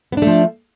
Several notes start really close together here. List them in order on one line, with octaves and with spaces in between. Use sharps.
B3 D4 A3 F3